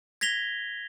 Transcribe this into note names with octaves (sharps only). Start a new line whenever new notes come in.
G#6 A#6 B6 F7 G7